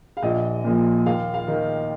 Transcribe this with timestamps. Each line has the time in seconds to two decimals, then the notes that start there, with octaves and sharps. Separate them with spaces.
0.17 F5
0.23 A#1 D#5
0.64 A#2 F3
1.06 D#2 F5
1.34 F5
1.48 D#3